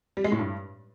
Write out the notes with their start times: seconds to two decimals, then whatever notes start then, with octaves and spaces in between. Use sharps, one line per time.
0.17 G3
0.24 G#3
0.32 A2
0.39 G2